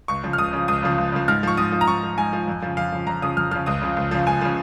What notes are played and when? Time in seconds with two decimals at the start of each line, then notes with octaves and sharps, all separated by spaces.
0.08 C#2 C#6
0.23 C#3 F3
0.33 F6
0.38 C#2 D#6
0.53 C#3 F3
0.68 C#2 D#6
0.83 C#3 F3
0.98 C#2
1.12 C#3 F3
1.28 G#2 F6
1.43 F3 C#6
1.57 G#2 D#6
1.72 F3
1.81 A#5
1.87 G#2 C#6
2.03 F3
2.17 G#2 G#5
2.33 F3
2.48 F2
2.62 C#3 F3
2.77 F2 F5
2.92 C#3 F3
3.06 F2 A#5
3.22 C#3 F3 D#6
3.37 F2 F6
3.51 C#3 F3 F6
3.66 C#2 D#6
3.82 C#3 F3
3.97 C#2
4.11 C#3 F3
4.26 C#2 G#5
4.41 C#3 F3